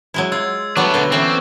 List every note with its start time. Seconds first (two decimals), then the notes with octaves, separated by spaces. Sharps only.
0.14 F#3 G#3 E4
0.32 F4 E6 G#6
0.77 F#3 G3 A3 B3 D4 C#6 D6 F#6
0.94 B2 D3 B3 A#6 G7
1.12 E3 A3 C4 C#4